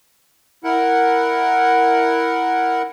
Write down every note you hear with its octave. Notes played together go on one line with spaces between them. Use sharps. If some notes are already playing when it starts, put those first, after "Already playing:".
E4 A#4 F#5